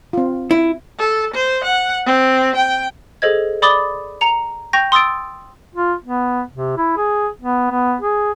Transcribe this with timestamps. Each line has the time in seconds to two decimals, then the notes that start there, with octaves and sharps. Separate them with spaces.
0.13 C4 F4
0.51 E4
0.98 A4
1.34 C5
1.64 F#5
2.06 C4
2.55 G5
3.22 G#4 A4 C5 D#5 G#6
3.62 D5 B5 D6 D#6 A6 G7
4.21 A#5 C#7 F7
4.73 G5 C#6 G6 A#6 F7
4.92 C6 D#6 E6 A6 D7
5.75 F4
6.04 B3
6.54 C3
6.77 E4
6.97 G#4
7.42 B3
7.71 B3
8.01 G#4